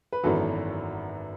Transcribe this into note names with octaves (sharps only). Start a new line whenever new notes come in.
B4
G#1 F#2 E3 B3 F#4 A4